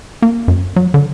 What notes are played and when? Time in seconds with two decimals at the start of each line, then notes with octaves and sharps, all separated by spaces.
0.22 A#3
0.48 F#2
0.76 F#3
0.94 D3